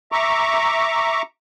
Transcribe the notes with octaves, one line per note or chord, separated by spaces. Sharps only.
E5 A#5 C#6 D6